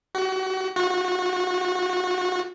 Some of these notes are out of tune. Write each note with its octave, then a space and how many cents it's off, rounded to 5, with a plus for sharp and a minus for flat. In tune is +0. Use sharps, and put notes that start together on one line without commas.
F#4 +30
F#4 -30